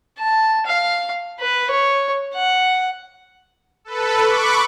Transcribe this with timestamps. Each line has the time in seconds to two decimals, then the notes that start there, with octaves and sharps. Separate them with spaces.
0.19 A5
0.67 F5
1.40 B4
1.71 C#5
2.35 F#5
3.84 A4 B4
4.21 B5 C#6 D6 F#6